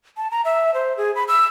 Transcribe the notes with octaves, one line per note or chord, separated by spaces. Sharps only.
A5
A#5
E5
C5
G#4
B5
E6